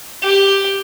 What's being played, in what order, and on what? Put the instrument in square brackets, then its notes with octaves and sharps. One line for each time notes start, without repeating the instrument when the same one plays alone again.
[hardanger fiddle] G4